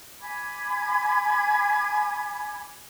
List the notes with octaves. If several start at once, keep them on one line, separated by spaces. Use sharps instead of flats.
G#5 B5 D6 G#6